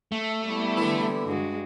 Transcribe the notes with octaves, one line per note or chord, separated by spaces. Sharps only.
A3
G3 B3 E4
D3 E3
G2 G#3 F#4